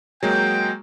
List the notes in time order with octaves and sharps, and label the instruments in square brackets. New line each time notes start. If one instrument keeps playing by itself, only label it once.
[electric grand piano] F#3 G#3 A#3 [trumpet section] G5